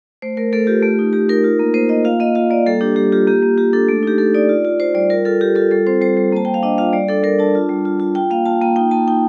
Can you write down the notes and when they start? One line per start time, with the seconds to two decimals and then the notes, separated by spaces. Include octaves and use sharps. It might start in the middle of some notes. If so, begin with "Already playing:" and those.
0.22 A3 C5
0.37 A3 A#4
0.53 A3 A4
0.67 F4 G4
0.83 A3
0.99 D#4
1.13 A3 G4
1.29 D#4 A#4
1.44 F4
1.59 A#3
1.74 A#3 C5
1.89 A#3 D#5
2.05 F4 F5
2.20 A#3 D#5
2.35 F4 F5
2.50 A#3 D5
2.66 G3 A4
2.81 D4 G4
2.96 G3 G4
3.12 F4 G4
3.27 A#3 G4
3.42 A#3
3.58 F4 G4
3.73 D4 A4
3.89 A3
4.03 D#4 G4
4.18 A3 A4
4.34 D#4 D5
4.49 F4
4.65 F4
4.80 F4 C5
4.95 G3 D5
5.10 F4 A#4
5.25 F4 A4
5.41 F4 G4
5.55 F4 A4
5.71 G3 A4
5.87 C4 C5
6.01 G3 C5
6.17 G3
6.32 A#3 A5
6.45 A#3 G5
6.54 F5
6.63 D4 D#5
6.78 F4 F5
6.93 G3 D5
7.08 D4 A4
7.23 G3 A#4
7.39 D4 A5
7.55 F4
7.69 G3
7.85 F4
8.00 F4
8.15 F4 G5
8.31 A#3 F5
8.46 F4 A5
8.61 A#3 G5
8.76 D#4 G5
8.91 A#3 A5
9.08 D#4 G5